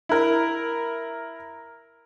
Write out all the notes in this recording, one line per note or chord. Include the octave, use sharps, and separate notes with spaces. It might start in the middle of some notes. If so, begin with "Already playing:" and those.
E4 A#4